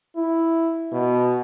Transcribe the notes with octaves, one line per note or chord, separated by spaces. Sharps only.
E4
B2